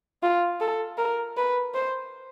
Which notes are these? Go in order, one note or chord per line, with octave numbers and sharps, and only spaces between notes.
F4
A4
A#4
B4
C5